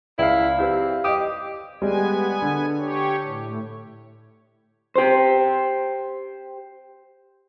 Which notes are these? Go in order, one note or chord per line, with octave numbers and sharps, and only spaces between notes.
C#2 E4 B4 D5 F5
C4 E4 G4 B4
G4 D#5 D#6
G3 G#3 B3 G#5
D3
G4 C#5
A2
G4 C5